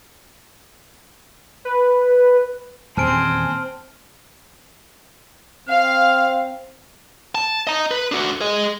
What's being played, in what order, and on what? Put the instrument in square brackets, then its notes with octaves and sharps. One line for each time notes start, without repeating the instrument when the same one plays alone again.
[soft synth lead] B4
[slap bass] D#1 E2 [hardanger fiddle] C4 [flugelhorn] G#5 [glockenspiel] A5 F6 D7
[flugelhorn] C4 [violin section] F5 [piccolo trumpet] F6
[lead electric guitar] A5
D#5 A#5
B4
D4 F#4
G#4 D#5